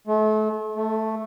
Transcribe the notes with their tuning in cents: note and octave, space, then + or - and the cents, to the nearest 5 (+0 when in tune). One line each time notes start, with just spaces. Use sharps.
A3 -35
A3 +0